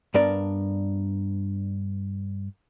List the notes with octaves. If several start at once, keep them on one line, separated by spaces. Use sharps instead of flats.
G2 B3 D4 A#4 D5